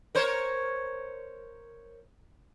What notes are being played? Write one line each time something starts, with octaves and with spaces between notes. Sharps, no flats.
A#4 C5 C#5